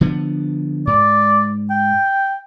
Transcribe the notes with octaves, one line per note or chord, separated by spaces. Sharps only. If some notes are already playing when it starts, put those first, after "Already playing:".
D3 F3 B3
G#2 D5
G5